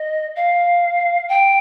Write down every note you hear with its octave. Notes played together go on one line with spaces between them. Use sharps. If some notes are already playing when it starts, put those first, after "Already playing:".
Already playing: D#5
F5
G5